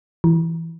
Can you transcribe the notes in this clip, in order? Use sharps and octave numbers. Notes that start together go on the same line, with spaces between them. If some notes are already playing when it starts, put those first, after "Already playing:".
E3